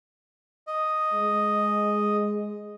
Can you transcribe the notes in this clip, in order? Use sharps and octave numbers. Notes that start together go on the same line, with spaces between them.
D#5
G#3